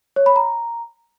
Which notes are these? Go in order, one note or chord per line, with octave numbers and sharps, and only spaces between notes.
C#5
B5
A#5